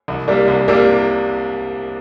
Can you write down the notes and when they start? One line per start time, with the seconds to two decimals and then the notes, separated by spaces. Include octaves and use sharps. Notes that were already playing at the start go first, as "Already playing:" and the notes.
0.08 C2
0.28 C3 G3 A#3 D4
0.48 C2
0.68 C3 G3 A#3 D4